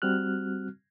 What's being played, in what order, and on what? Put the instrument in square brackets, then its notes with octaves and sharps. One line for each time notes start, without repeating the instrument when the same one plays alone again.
[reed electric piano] G3 C4 F#4 F6 F#6